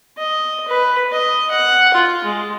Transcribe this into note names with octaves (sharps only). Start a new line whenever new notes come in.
D#5
B4
D#5
F#5
F4
G#3